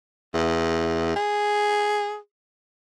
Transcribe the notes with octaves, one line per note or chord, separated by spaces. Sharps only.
E2
G#4